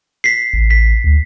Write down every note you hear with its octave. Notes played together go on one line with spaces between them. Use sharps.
B6 C7
A1
B6
D2